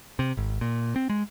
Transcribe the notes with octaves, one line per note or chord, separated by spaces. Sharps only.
C3
G#1
A#2
C4
G#3